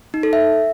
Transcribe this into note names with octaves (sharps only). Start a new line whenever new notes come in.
D#4
A4
E5